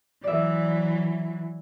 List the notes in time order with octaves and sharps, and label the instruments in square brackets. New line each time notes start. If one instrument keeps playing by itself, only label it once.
[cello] E3 F#3 [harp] D5 E5